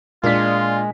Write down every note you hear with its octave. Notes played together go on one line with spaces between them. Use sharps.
A#2 G#3 D4 F4 B6